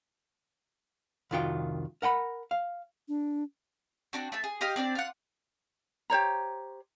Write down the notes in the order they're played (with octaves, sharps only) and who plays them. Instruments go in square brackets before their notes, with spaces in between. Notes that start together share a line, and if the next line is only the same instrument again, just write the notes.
[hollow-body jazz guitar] C2 F2 D#3 F4 F#4 G5
A#4 F#5 G5 B5
F5
[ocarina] D4
[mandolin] C4 D4 F#4
A3 E5 A5
G#4
G4 D#5 F5 D#6
C4 D4 A#4 D5
F4 F#5
[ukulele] G4 C5 C#5 A#5